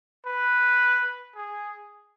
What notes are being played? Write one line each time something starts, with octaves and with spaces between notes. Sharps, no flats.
B4
G#4